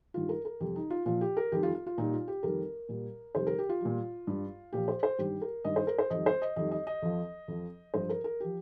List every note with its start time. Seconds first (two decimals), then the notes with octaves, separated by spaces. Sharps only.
0.14 G2 D#3 G3 F4
0.29 A#4
0.45 A#4
0.60 F2 C3 G3 G4
0.76 D#4
0.90 F4
1.06 A#2 F3 F4
1.21 G4
1.37 A#4
1.52 F2 D#3 G3 G4
1.63 F4
1.75 F4
1.86 F4
1.98 A#2 G3 D#4
2.13 F4
2.28 G4
2.43 F2 D#3 G3 A#4
2.89 A#2 G3
3.35 F2 C3 D#3 G3 C5
3.47 A#4
3.58 G4
3.69 F4
3.81 A#2 G3
4.27 G2 G3
4.73 A#2 F3 G4
4.88 C5
5.03 C5
5.19 G2 D#3 G3 G4
5.42 A#4
5.65 G2 D#3 G3 D#5
5.76 C5
5.87 A#4
5.98 C5
6.10 F2 D#3 G3 D#5
6.26 C5
6.42 D#5
6.56 F2 D#3 G3 D#5
6.71 D#5
6.87 D#5
7.02 F2 F3
7.48 F2 F3
7.94 G2 F3 C5
8.09 A#4
8.24 A#4
8.40 F3 G4